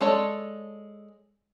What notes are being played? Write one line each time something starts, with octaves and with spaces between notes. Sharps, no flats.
G#3 A4 C#5 D5